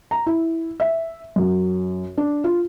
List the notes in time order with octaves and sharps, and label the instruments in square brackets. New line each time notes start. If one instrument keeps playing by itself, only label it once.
[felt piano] A#5
E4
E5
F#2
D4
F4